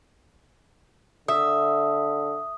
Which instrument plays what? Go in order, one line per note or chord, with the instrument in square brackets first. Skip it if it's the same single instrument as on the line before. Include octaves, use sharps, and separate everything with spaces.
[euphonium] D3 [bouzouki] E5 [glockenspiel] D#6